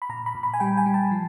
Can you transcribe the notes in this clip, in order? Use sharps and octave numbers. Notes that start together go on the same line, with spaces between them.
B5
A#2 A#5
B5
A#2
B5
G#5
G3 G5
G#5
G3
A5
F3